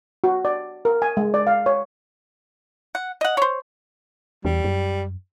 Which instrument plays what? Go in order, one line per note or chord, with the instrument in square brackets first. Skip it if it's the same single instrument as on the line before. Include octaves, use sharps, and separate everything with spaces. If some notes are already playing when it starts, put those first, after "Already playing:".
[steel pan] F#4
D5
A#4
G#5
G#3
D5
F5
C#5
[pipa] F#5
D#5 F#5
C5 C#5
[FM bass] E2 [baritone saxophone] G3
[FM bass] F#2